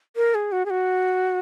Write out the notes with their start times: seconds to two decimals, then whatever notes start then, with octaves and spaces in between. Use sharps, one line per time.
0.16 A#4
0.35 G#4
0.52 F#4
0.66 G#4
0.70 F#4